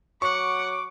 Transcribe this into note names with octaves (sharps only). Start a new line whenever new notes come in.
F#3 F#5 C#6 D6